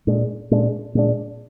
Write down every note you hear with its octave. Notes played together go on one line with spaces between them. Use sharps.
A#2 G#3 D4
A#2 G#3 D4
A#2 G#3 D4